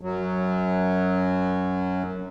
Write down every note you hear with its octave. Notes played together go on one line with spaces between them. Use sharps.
F#2 F#3